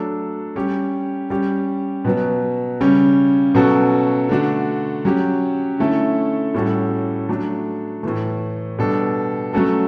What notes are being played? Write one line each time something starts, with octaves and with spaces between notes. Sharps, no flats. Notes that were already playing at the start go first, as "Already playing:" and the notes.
Already playing: F#3 A3 D4 A4
G3 C#4 G4
G3 C#4 G4
B2 F#3 B3
C#3 G3 C#4
B2 F#3 C#4 F#4 A4
D3 A3 D4 F#4
F#3 C#4 G4
D3 A3 C#4 E4 A4
A2 G3 C#4 F#4 A4
F#3 A3 D4
A2 E3 A3
B2 G3 D4 A4
F#3 A3 C#4 F#4 A4